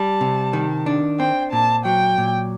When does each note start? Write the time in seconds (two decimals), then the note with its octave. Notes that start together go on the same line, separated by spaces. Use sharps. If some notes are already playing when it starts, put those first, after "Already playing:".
Already playing: G3 A5
0.21 C3
0.53 D#3
0.86 D4
1.19 C4 G5
1.52 A#2 A5
1.85 F#3 G5
2.18 A#2